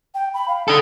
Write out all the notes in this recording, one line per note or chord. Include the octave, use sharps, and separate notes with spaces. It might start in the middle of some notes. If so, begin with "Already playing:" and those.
G5
B5
F5
D4 A4 D#6